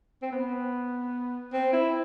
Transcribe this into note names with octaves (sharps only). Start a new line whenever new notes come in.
C4
B3
C4
E4